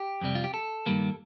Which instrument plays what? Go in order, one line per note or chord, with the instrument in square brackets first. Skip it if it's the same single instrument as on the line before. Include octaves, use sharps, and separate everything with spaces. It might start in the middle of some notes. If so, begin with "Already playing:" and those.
Already playing: [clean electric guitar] G4
F2 C3 G3
F4
G4
A4
G2 D#3 G3 A#3